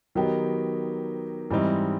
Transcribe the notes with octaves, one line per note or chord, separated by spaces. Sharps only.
D#3 F#3 B3 D#4 G4
G#2 E3 G3 C4 D#4